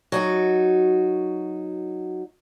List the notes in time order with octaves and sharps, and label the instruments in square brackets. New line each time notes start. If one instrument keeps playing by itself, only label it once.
[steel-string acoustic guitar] F#3 D#4 F#4